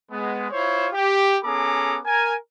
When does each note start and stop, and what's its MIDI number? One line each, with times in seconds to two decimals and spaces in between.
0.11 0.48 56
0.11 0.48 59
0.52 0.88 64
0.52 0.88 65
0.52 0.88 72
0.52 0.88 73
0.93 1.37 67
1.44 1.99 59
1.44 1.99 61
1.44 1.99 68
1.44 1.99 69
1.44 1.99 82
1.44 1.99 86
2.06 2.35 70
2.06 2.35 80